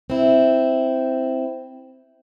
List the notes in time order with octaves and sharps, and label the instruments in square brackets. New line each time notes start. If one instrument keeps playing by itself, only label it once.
[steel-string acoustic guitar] C4 E4